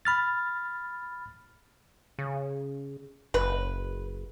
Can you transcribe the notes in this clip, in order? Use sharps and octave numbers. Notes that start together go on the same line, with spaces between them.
B5 F6 A6
C#3
F#1 B4